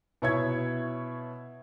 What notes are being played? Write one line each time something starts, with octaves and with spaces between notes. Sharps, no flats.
B2 E4 C#5 G#6